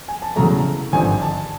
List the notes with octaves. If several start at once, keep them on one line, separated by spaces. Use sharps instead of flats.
G#5
A5
E2 C#3 F#3 A3 A#5
G#1 G2 D3 F3 G#5
A5